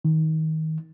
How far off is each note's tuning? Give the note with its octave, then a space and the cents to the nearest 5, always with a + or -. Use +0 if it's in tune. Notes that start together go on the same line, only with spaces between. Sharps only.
D#3 +25